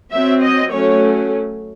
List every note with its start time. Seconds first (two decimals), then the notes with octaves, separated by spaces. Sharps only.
0.12 F#3 C4 E5
0.42 D#5
0.73 F#3 A3 C#4 C#5